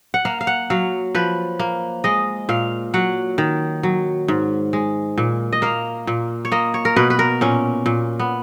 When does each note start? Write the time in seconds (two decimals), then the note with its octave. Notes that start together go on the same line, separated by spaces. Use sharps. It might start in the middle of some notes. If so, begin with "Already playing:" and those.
0.14 F#5
0.25 A#3 F5
0.41 F5
0.47 F#5
0.70 F#3 F5
1.15 F3 B4
1.59 A#3
2.04 G#3 D#5
2.49 A#2 F5
2.94 F#3 F#5
3.38 D#3
3.83 F#3
4.28 G#2
4.73 G#3
5.18 A#2
5.53 D#5
5.62 A#3 F5
6.07 A#2
6.45 C#5
6.52 A#3 D#5
6.74 C#5
6.85 A#4
6.96 B2 B4
7.10 B4
7.19 A#4
7.41 A#2 C#4
7.86 A#2
8.19 B3